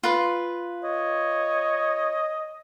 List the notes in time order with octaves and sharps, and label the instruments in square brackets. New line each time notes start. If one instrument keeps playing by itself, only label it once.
[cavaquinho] F4 B4 C6
[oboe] C#5 [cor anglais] D#5